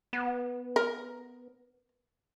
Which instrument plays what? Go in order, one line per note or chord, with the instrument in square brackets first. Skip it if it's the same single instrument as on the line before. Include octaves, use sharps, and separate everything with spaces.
[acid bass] B3
[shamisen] A#4